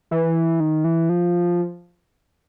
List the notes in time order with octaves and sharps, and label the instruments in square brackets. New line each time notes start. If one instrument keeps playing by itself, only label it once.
[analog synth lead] E3
D#3
E3
F3